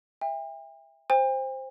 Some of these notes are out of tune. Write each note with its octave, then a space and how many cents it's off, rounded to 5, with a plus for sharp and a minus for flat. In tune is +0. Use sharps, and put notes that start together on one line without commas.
E5 +0 G5 +40
C5 +5 G5 +45